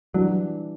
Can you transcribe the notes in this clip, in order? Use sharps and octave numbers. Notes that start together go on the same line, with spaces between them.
E3 F#3 G3 D4